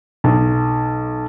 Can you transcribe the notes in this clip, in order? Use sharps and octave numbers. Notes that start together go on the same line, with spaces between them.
B1